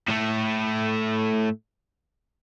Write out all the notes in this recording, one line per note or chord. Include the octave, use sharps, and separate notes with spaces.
A2 A3